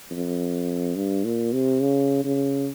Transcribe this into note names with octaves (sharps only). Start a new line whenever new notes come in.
F2
G2
A#2
C3
C#3
C#3